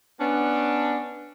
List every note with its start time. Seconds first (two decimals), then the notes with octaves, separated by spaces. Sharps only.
0.20 B3 C#4 D4